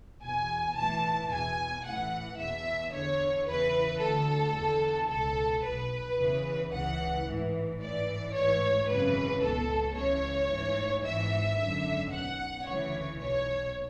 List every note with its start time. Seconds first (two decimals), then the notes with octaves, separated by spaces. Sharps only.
0.23 E2 B2 G#5
0.77 B1 A2 E3 A5
1.31 E2 B2 G#5
1.85 A1 A2 E3 F#5
2.39 E2 B2 E5
2.93 E2 D3 C#5
3.47 E2 C#3 E3 B4
4.02 D2 D3 A4
4.56 E2 D3
5.10 C#2 B2 A4
5.64 B1 B2 B4
6.18 E2 C#3 E3
6.72 C#2 C#3 E3 F#5
7.26 A1 G#2 E3
7.80 A1 G#2 E3 D5
8.34 A1 G#2 E3 C#5
8.88 G#1 F#2 C#3 E3 B4
9.42 C#2 B2 A4
9.96 C#2 C#3 E3 C#5
10.50 A1 G#2 E3
11.04 G#1 G#2 E3 E5
11.58 G#1 F#2 D3
12.13 B1 B2 F#5
12.66 D2 C#3 E3 C#5
13.20 B1 B2 C#5